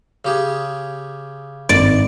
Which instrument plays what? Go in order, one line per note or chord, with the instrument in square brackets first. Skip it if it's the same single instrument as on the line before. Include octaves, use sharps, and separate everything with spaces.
[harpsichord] C#3 G4 G#4
[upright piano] G#1 [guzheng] D5